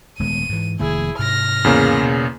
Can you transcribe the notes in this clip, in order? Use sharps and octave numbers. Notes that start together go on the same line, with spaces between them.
D#1 G#3 B3 D#7
G#2 E3
F1 D#3 A#3 E4 G#4
G#2 C3 F6 A#6
E2 C#3 A#3
B2